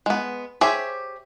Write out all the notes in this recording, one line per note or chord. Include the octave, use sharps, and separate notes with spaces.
G#3 B3
G4 G#4 C5 C#5 E5